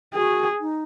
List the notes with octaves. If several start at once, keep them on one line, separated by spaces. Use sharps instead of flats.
F#4 G#4
D#4